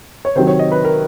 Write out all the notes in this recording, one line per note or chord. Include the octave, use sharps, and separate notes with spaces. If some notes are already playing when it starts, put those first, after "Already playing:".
C#5
C3 D#3 F#3 C5
C#5
D#5
B4
A#4